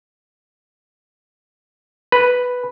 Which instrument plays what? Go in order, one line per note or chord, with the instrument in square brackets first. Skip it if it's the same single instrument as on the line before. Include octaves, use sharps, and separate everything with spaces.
[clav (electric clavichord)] B4